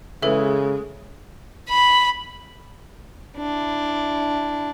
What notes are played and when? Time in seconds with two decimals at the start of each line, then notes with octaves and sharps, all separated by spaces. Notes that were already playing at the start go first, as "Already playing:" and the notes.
0.22 C#3 E3 G#3 A4 E5
1.69 B5
3.37 D4 E4